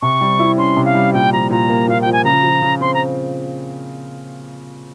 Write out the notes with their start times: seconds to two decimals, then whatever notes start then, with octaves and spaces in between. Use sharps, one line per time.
0.02 C3 C#6
0.21 G3
0.39 E4
0.58 C#4 C6
0.76 C3
0.85 F5
0.95 G3
1.13 A#2 G5
1.33 F3 A#5
1.51 A#2 A#5
1.69 A#3
1.88 A#2 F5
2.02 F3 G5
2.13 G#5
2.25 C#3 A#5
2.43 F3
2.62 C#3
2.81 C4 C6
2.94 A#5